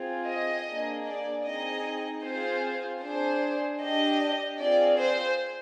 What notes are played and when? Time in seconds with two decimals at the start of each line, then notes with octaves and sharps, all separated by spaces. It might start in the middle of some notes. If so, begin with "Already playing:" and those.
Already playing: C4 F4 G#4
0.28 D#5
0.66 A#3 D4 G#4
1.06 D5
1.45 C4 D#4 G#4 D#5
2.24 C4 F4 G#4 C5
3.02 D4 G#4 C5
3.81 D4 G4 D#5
4.60 C4 F4 G#4 D5
4.99 C5